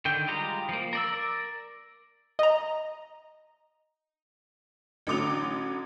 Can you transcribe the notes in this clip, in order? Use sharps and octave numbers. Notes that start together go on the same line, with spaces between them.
D3 D#3 G5
G3 G#3 F4 G4 A#5
F3 A#3
A#4 D5 E6
D#5 A#5
A1 D3 F#3 D6 D#6 F7